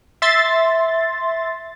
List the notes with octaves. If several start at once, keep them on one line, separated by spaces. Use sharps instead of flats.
E5 C6 A6